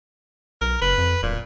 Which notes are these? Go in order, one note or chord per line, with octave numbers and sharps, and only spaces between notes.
B1 A#4
F#1 B4
F2
D1 A#2